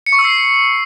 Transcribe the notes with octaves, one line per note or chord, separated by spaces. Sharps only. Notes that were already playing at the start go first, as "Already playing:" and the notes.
C#7
C#6
E6
C7